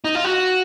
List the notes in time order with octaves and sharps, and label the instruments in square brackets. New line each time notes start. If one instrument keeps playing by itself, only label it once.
[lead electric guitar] D#4
F4
F#4